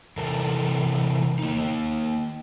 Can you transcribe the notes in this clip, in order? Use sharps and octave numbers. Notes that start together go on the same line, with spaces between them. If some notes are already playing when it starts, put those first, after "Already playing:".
C3 E3 A4 A#4
A#3 D#4